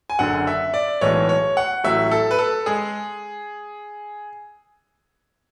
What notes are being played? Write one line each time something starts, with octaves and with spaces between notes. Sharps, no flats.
G#5
F#1 F#2 D3 F#5
E5
D5
B1 A2 E3 G#3 C#5
C#5
F#5
A1 A2 F#3 E5
A4
B4
A4
G#3 G#4